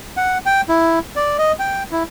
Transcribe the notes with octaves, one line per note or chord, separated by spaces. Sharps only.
F#5
G5
E4
D5
D#5
G5
E4